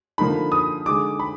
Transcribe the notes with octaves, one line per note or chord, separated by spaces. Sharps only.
D3 F3 A#3 D#4 B5
D#6
D3 G#3 D#4 D6
B5